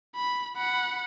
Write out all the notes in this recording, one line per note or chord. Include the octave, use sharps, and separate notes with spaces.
B5
F#5 B5